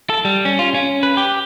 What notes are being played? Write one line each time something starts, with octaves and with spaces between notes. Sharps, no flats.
A4
G3
C#4
F4
C#4
B4
G4